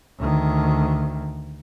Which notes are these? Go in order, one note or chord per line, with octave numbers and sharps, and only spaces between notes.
D2 D#3